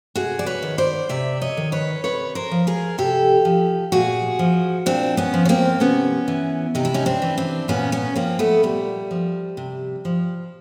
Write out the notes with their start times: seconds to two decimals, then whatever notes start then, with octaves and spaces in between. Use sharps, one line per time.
0.16 C3 F#4 G#4
0.39 D5
0.46 B4 C#5
0.62 D#3
0.78 C5 D5
1.09 C3 D5 E5
1.42 C#5 D#5
1.57 D#3
1.72 B4 C#5
2.04 C3 B4 C#5
2.35 A#4 C5
2.51 F3
2.67 G#4 A#4
2.98 C3 G4 A4
3.45 F3
3.92 A#2 F#4 G#4
4.39 F3
4.86 A#2 C4 D4
5.17 B3 C#4
5.34 F3
5.45 C#4
5.49 A#3 C4
5.80 C3 B3 C#4
6.28 E3
6.75 C3 D#4
6.85 E4
6.94 C#4 D#4
7.06 C4 D4
7.22 E3
7.38 C4 D4
7.68 A#2 B3 C#4
7.92 B3 C#4
8.16 F3 A#3 C4
8.39 A3 B3
8.63 A#2 G3
9.11 F3
9.57 C3
10.05 F3